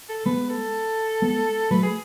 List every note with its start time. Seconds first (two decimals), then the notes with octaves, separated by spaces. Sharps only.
0.09 A4
0.26 G#3 B3 B4
0.50 A4
1.22 G#3 B3
1.71 F#3 A3 B4
1.83 G#4